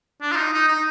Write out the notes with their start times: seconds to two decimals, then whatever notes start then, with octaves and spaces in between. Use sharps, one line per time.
0.21 D4
0.32 F4
0.36 D#4
0.53 D#4
0.68 D#4